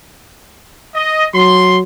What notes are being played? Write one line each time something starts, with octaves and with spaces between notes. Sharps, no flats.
D#5
F#3 C6